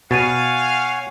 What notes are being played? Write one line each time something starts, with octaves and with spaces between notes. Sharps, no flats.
B2 C#5 F5 F#5 G#5 A6 D#7